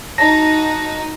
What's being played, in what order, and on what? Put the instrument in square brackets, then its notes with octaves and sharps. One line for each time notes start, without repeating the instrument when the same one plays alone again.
[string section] D#4 F#4 [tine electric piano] A5 A#6